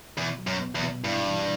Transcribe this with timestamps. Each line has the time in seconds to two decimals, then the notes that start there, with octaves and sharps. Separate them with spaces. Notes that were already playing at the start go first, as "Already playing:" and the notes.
0.17 E2 B2
0.38 F#3
0.47 F#2
0.60 B3
0.75 E2
0.83 B2
1.04 G2 E4
1.27 E3